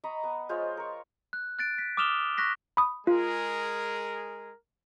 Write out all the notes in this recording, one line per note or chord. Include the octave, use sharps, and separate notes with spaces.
D#5 A#5 B5 C#6
B3
G#3 F4 C5 C#5
A#4 C#6
F#6
F#6 A6 D7
B6
D6 D#6 F6 E7 F7 G7
C#6 F#6 A#6 B6
B5 D#6
G#3 F4 G#4 A#4